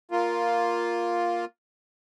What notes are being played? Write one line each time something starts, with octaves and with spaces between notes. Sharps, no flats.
A#3 F4